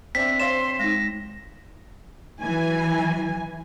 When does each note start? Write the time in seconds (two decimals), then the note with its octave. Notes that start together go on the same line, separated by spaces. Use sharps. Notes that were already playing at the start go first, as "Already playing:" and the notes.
0.15 C4 D4 E5 B6
0.40 C5 C#5 F5 C6 E7
0.79 G#3 D#4 A#6
2.40 E3 F#3 G#5